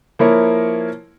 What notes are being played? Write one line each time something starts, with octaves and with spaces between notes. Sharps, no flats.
F3 A#3 E4 A#4 C#5